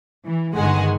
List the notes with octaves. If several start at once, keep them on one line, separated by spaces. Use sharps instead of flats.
E3
G1 G2 D#3 G#3 F#5 G#5